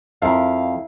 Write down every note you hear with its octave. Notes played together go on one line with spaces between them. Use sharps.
F2 E4 A#4 F5